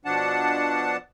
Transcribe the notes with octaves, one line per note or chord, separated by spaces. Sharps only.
B2 F3 D4 F#5 A5